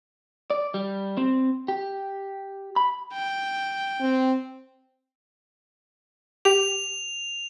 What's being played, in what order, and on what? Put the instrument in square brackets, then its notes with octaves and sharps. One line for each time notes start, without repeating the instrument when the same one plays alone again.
[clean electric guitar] D5
G3
C4
G4
B5
[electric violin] G5
[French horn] C4
[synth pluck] G4 [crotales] F7